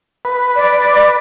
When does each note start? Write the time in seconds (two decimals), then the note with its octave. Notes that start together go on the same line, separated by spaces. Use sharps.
0.25 B4
0.56 D5